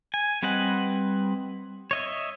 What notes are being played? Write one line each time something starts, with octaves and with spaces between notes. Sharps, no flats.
G#5
G3 C4 B4 D#5 F#5
C#5 D#5 E5